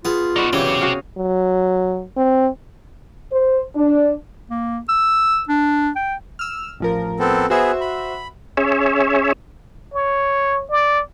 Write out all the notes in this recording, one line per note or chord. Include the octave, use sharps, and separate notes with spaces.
B3 F4 G#4 A5
D#4 F#4 B4 D5
G2 C#3 E3 F#3 C4 G4
F#4 G#4 F5
F#3
C4
C5
D4
A#3
E6
D4
G5
E6 F6
A1 F3 A#4
B3 C4 A4
B3 F#4 G#4 C5 E5
B5
C#4 G#4 C#5 E5
C#5
D5